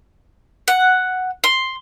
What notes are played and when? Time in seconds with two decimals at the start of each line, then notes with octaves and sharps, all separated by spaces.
0.68 F#5
1.44 C6